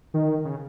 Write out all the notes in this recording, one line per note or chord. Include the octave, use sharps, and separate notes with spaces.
D#3
C#3